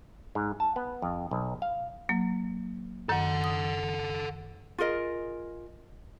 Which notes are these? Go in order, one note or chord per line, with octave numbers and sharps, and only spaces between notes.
G#2
A5
B3
F2
B1
F5
F#3 A#3
F#2 D#3 A4 F#5
D#6
F4 G#4 A#4 D#5